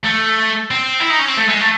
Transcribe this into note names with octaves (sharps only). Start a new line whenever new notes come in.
A3
C4
E4
D#4
C#4
C4
A3
G#3
A3